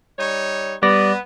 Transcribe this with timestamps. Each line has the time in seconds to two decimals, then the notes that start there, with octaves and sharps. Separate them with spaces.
0.19 G3 D#4 C#5
0.83 G3 B3 D5 A#6